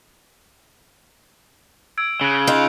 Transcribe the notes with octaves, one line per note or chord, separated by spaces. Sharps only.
E6 G#6 D7
C#3 F#6 D7
D#4 F4